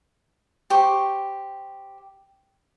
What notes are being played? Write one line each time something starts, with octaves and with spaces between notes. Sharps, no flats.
G4 C5 C#6